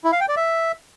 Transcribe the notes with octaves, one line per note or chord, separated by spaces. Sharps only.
E4
F5
G5
D5
E5